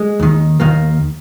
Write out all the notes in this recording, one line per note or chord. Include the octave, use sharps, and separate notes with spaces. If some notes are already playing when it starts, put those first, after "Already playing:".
Already playing: G#3
D#2 D#3
D#2 D#3 A#3